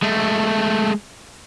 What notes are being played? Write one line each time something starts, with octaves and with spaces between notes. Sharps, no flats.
G#3 A3